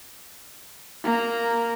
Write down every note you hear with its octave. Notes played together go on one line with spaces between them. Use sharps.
A#3 A#5